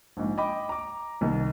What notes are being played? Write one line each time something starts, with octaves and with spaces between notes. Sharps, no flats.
A#1 G#2
D#5 G5 B5 D6
A#5 D6
C2 D#3